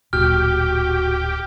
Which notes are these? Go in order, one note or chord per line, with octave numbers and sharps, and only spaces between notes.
D1 A#2 F#4 G4 F6